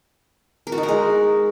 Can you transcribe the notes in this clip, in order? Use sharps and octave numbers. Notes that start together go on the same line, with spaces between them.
A#4
F#4
D#4
A#4
G#3